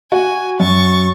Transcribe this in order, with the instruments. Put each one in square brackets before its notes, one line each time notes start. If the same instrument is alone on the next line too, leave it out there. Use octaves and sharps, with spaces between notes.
[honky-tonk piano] F#4 [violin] G#5
[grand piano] F#2 [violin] C#6 A6